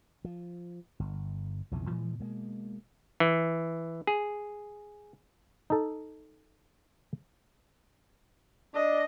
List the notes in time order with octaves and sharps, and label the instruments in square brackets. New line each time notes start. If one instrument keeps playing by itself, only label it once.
[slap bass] F3
G1
B1 F2 C#3 E3
A#2 E3 F3 G#3
B2 G#3 A#3
[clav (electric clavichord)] E3
G#4
D#4 A4
[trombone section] D4 [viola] D#5